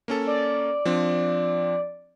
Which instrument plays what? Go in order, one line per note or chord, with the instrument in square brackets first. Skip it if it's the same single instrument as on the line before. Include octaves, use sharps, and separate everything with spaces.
[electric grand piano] A#3 C#4 A4
[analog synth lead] D5
[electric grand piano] F3 C4 D4